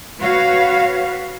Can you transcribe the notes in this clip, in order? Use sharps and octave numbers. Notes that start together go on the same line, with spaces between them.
F#4 B4 C#5 F5